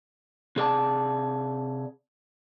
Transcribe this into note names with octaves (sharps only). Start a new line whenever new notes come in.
C3 G#4 D5 A5